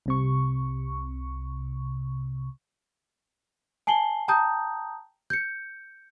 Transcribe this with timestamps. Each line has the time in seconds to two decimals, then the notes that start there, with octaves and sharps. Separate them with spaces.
0.06 C2 C3 C#6
3.87 G#5 A5 C7 F#7 G7
4.28 G5 A5 A#5 D#6 G6
5.30 G6 C#7